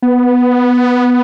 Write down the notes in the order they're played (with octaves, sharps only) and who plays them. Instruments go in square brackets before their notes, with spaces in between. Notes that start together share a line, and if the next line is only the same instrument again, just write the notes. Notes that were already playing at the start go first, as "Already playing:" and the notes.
[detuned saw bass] B3